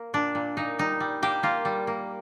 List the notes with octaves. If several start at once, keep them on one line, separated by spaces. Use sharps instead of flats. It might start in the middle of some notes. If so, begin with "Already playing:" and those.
Already playing: A#3
A#2 D4
A#2
A#2 D#4
G3 D#4
G3
A#3 G4
A#3 F4
G3
A#3